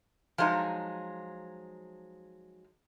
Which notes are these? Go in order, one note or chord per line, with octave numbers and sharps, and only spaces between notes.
F3 F#3 G#3 D#4